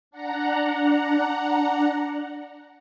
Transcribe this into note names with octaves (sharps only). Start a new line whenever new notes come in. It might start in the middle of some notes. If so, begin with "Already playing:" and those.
D4 F#5 A#5